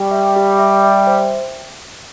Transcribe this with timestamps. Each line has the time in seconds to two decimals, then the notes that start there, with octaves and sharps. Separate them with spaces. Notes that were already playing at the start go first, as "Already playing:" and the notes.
Already playing: G3 G4
0.11 E5
0.36 G4
0.59 E5
0.82 E5
1.07 C5